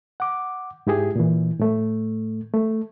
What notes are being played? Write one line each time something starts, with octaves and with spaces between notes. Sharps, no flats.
F#5 D6
G#2 E4 G4 G#4
A#2 E3
A2 A3
A3